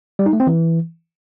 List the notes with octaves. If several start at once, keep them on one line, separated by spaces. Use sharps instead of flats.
G3
D#4
A3
C4
E3